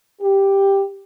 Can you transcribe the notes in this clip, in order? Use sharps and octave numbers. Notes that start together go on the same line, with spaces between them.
G4